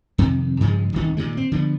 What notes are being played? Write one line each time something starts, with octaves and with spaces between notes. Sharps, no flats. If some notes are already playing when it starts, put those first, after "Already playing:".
F2 C3 D#3
G2 C#3 F3 G#3
D1 C2 D#3 C#4
A#2 D#3 G#3
C4
D3 F3 A3 B3